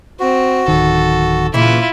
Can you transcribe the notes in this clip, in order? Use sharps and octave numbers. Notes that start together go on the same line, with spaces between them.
C4 F#4
D1 D#3 A4
A#2 C#3 E3 E4 F4